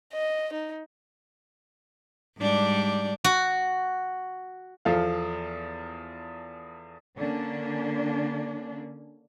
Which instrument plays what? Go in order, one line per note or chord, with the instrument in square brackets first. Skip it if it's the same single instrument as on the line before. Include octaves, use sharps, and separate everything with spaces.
[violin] D#5
D#4
[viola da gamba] G#2 G3 D4
[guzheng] F#4
[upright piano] E2 F3 A4 F5
[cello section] D3 A#3 C#4 D4